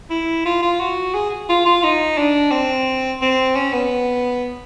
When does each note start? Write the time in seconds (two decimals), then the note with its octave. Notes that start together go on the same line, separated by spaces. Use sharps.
0.10 E4
0.45 F4
0.62 F4
0.80 F#4
1.14 G#4
1.49 F4
1.66 F4
1.83 D#4
2.18 D4
2.51 C4
3.22 C4
3.56 C#4
3.72 B3